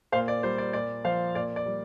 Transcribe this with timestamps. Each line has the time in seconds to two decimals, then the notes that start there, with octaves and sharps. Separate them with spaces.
0.12 A#2 C5 F5
0.28 D5
0.43 G3 C5
0.58 D5
0.73 A#2 D5
1.05 F3 C5 F5
1.35 A#2 D5
1.56 D5
1.66 G3